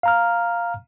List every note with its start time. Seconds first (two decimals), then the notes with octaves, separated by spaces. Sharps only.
0.03 F5 A#5 F6